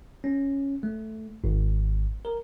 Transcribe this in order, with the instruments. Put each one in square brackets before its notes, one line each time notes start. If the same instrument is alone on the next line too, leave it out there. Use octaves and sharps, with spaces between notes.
[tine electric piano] C#4
A3
G#1
A#4